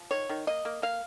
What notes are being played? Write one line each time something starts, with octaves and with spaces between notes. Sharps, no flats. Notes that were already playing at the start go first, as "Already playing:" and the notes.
Already playing: F3
D#3 C#5
D#3
A#3 D#5
A#3
A#3 F5